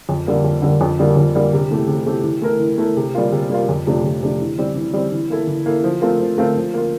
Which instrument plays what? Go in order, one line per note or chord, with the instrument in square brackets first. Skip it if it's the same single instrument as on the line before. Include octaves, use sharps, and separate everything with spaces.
[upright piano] F2
D3 G3 A#3
F2
D3 G3 A#3
F2
D3 G3 A#3
F2
D3 G3 A#3
C3
E3 A3 C4 G4
C3
E3 A3 C4 G4
E3
A3 E4 A#4
E3
A3 E4 A#4
C3
G3 A#3 F4
C3
G3 A#3 F4
F2
C3 F3 A3 D4
F2
C3 F3 A3 D4
E3
G3 C4
E3
G3 C4
E3
A#3 E4 A4
E3
A#3 E4 A4
F3
A3 C4 F4 A#4
F3
A3 C4 F4 A#4
F3
A#3 F4